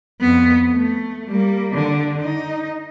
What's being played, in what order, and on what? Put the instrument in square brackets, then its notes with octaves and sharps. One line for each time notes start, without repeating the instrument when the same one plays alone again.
[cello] F2 B3
A3
G3 A#3
D3
D#4